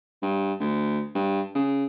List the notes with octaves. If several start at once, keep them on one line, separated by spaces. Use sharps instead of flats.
G2
D2
G2
C#3